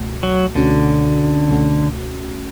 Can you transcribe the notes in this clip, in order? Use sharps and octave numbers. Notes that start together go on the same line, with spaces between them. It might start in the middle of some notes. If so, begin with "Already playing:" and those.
Already playing: C#2 B2 A3 F#4
F#3
C#2 B2 D3 A3 C#4 F#4
C#2 B2 A3 C#4 F#4